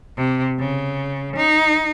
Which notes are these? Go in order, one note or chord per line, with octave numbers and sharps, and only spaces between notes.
C3
C#3
D#4